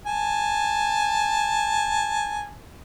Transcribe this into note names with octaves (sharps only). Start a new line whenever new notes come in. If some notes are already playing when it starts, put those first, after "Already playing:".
G#5 A5